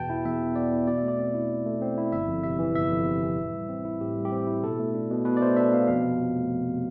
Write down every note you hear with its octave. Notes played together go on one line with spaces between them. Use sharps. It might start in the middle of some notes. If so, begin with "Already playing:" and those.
Already playing: E2 B2 B3 G5 A5
E4
E2 E5
B2
B3 D5
E4
B2 D5
A3 E5
D5
C4
E4
B2
A3
C4
E4
G1 E5
F2
C3 E5
E3
G1 E5
F2
C3
E3
A2
G3
C4
E4
A2 G4
G3
G4
C4
E4
B2 A4
A3
D4
B2
B2 B4
D5
A3 C5
D4 E5
B2 F5
F2 F5
C3
F3
A3
F2
C3